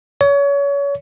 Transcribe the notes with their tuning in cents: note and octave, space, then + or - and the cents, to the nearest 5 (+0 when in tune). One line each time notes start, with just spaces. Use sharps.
C#5 +30